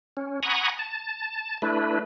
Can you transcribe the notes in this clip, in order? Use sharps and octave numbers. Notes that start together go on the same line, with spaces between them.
C#4
F#5 G#5 A#5 B5 C#6 D#6
A5
A3 D4 E4 B4